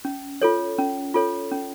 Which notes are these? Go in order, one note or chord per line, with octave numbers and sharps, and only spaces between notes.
C#4
F4 A4 C#5
C#4
F4 A4 C#5
C#4